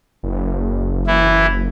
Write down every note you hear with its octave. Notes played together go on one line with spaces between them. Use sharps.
F#1
E3 E4